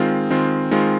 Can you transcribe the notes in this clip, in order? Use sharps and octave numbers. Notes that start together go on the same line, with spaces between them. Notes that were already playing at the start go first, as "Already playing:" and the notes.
Already playing: D#3 G#3 C4 F4
D#3 G#3 C4 F4
D#3 G#3 C4 F4